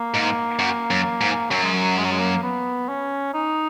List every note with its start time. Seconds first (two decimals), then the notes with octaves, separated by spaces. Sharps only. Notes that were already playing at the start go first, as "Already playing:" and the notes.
Already playing: A#3
0.14 G#2
0.59 F#2
0.91 F#2
1.21 G#2
1.50 F#2 F#3
1.63 G#3
1.73 F#3
1.97 G#3
2.04 F#3
2.11 G#3
2.19 A#3
2.43 B3
2.89 C#4
3.34 D#4